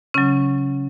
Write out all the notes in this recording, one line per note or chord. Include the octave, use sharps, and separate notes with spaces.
C#3 F#3 C#4